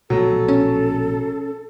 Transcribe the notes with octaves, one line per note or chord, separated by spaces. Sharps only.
A#1 B2 F#3 A3 A4
C#4